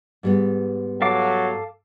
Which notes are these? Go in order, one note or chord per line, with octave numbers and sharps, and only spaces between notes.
G#2 G3 B3
F#3 A4 F5 D6